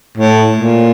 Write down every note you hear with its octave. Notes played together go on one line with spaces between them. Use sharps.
A2
A#2